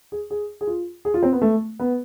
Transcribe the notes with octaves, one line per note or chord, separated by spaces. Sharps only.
G#4
G#4
G#4
F4
G#4
F4
C4
B3
A3
B3